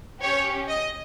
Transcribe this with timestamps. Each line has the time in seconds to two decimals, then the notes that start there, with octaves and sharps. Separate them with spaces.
0.22 C#4 G4 C#5
0.68 D#5